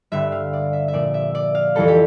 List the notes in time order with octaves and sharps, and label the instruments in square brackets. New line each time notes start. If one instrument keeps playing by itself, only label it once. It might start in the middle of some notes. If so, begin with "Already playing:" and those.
[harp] G2 D3 G3 E5
F5
D5
E5
E5
A#2 F3 D5
E5
D5
F5
F2 E3 G3 A4
G4